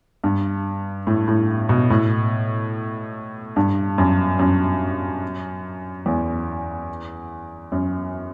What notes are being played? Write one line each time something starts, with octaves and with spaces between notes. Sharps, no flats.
G2
A2
A2
B2
A2
G2
F#2
F#2
E2
F#2